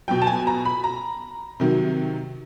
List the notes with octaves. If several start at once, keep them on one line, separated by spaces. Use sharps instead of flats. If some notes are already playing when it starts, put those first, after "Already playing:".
B2 F#3 G5
A5
G#5
A#5
B5
A#5
C3 D#3 F#3